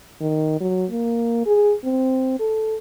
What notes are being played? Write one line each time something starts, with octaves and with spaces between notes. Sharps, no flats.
D#3
F#3
A#3
G#4
C4
A4